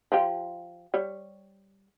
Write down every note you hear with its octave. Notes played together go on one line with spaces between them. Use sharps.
F3 F4 G4
G3 C#5